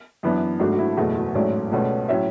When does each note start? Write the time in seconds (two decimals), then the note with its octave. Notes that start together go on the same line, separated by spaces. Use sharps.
0.23 F#2 E3 B3 D4
0.60 G#1 G#2 F#3 A3 D4 F#4
0.73 F#4
0.79 E4
0.97 F#1 E2 B2 A3 F#4
1.16 F#4
1.35 A1 G#2 F#3 A3 C#4 D5
1.72 C#2 B2 A3 C#4
2.09 A2 F#3 C#4 E5